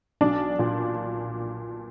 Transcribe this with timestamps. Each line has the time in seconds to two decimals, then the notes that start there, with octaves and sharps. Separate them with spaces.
0.21 B1 D4 D5
0.59 A#2